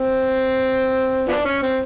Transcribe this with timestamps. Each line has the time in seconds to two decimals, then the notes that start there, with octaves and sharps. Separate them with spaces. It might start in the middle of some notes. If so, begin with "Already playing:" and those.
Already playing: C4
1.28 F3 B3 D4
1.45 C#4
1.62 C4